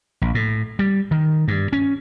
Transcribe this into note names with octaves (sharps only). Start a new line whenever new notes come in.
A#1
A2
G3
D#3
G2
C#4